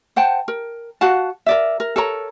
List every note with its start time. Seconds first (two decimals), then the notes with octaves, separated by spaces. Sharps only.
0.16 C5 F#5 G5 A5
0.48 A#4
1.01 F#4 F5 F#5 A5
1.46 A#4 D5 E5
1.80 A#4
1.96 A4 A#4 C#5 A#5